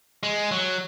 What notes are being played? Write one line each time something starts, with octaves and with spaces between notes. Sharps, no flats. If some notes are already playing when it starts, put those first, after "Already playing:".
G#3
F#3